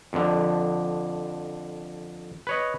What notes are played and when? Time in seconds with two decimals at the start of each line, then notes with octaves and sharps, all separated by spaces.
0.13 F2 D3
2.47 B4 C#5 D#5